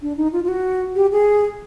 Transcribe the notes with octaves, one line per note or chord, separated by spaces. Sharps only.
D4
D#4
F4
F4
F#4
G4
G#4